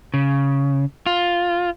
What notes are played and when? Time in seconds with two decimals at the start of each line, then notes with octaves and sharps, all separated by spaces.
0.14 C#3
1.06 F4